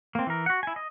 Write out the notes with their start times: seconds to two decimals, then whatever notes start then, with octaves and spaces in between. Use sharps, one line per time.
0.15 A#3 C4
0.27 E3 A#4
0.46 F#4 F#5
0.63 E4 G#5
0.76 D#5